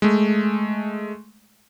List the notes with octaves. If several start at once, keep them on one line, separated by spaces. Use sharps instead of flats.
G#3 A3